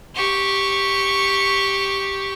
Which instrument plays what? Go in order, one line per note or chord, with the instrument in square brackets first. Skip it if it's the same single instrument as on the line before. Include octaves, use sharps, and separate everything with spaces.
[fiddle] G4 C#6